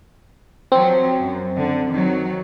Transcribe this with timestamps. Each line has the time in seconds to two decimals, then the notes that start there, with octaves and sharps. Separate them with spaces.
0.72 F3 F#3 C4
1.21 F#2
1.58 D3
1.92 D#3 F#3